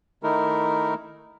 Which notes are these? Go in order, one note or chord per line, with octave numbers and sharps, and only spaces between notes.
D#3 A3 D#4 E4 A#4